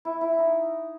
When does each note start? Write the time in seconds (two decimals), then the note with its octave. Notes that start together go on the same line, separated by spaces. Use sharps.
0.05 E4
0.21 E4
0.38 D#4